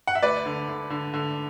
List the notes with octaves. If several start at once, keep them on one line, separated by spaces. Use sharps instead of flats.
F#5
E5
D2 B4 D5
D3
D3
D3
D3